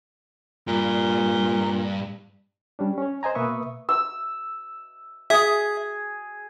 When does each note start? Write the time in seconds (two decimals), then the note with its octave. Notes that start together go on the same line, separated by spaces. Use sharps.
0.67 G2 A#2
2.79 G3 C#4 D4
2.98 C#4 C#5
3.23 C5 D#5 G#5 A#5
3.35 B2 A#3 B4 E5 C#6 D#6
3.89 E6
5.30 G#4 E5 D#6